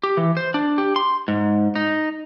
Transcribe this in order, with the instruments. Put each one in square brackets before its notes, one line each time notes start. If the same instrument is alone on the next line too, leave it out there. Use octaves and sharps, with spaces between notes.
[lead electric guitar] G4
E3
C5
D4
G4
C6
G#2
D#4